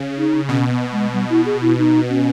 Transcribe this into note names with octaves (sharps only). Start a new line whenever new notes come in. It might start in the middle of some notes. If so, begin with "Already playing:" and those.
Already playing: C#3
D#4
B2 C#4
B3
G#3
G3
E4
G#4
E4
D#4
C#4